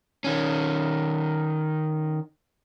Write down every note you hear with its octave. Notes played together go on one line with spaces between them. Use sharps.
D#3 C#4